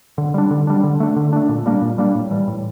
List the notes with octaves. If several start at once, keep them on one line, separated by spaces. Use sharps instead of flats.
D3
G3 D4
D3
G3 D4
D3
A3 D4
D3
A3 D4
A#2
G3 A#3 D4
A#2
G3 A#3 D4
A2
E3 G3
A2